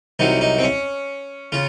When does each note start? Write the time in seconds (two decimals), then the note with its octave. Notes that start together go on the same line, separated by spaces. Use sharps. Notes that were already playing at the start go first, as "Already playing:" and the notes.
0.19 C2 C3 F#3 D#4
0.41 D#4
0.58 C4
0.63 C#4
1.52 C#3 F4